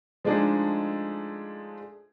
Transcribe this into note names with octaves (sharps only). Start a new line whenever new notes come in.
F3 G#3 A3 D4 D#4 G#4